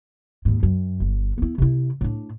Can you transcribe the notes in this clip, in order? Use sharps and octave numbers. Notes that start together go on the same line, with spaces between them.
D#2 G#2
F#2
G1
B3 E4
C3 E4
A2 D4